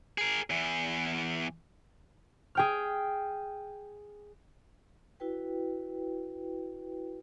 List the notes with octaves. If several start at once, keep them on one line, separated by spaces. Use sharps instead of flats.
G#4 A#4
E2 E3
G#4 G5 F6
E4 F#4 B4 G5